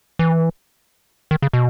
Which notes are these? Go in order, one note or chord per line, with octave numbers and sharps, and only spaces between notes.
E3
D#3
C#3
B2